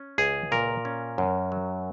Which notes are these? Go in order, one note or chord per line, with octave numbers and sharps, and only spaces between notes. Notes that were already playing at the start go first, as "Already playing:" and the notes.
Already playing: C#4
C#2 G#4
A#2 A#4
C#4
F#2
F#3